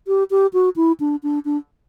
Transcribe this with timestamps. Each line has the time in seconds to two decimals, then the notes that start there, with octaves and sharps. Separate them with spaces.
0.07 G4
0.31 G4
0.53 F#4
0.76 E4
1.00 D4
1.23 D4
1.45 D4